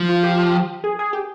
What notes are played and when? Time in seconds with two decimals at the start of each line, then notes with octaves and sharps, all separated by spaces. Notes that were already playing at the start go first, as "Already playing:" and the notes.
Already playing: F3
0.09 F4
0.23 G4
0.84 G#4
0.99 G#4
1.13 G4